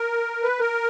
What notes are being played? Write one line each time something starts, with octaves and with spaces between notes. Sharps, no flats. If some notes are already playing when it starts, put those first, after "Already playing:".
Already playing: A#4
B4
A#4